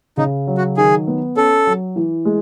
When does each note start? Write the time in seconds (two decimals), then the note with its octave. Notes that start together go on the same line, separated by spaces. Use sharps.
0.17 C#3 D#4
0.47 F#3
0.57 F#4
0.77 D#3 G#4
1.07 B3
1.36 C#4 A4
1.67 F#3
1.96 E3
2.25 G#3